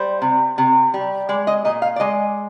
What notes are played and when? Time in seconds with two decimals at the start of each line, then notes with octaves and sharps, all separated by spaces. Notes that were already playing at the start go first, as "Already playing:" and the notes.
Already playing: G3 C5
0.22 C3
0.58 C3
0.94 G3
1.29 G#3 D5
1.47 D#5
1.65 A#2 D#5
1.82 F5
1.96 D5
2.00 G#3 D#5